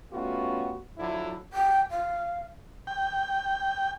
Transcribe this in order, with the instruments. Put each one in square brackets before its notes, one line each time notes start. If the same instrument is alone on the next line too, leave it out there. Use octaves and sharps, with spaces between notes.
[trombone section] G3 A3 B3 C#4 F4 F#4
D3 F3 F#3 E4
[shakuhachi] G5
F5
[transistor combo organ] G5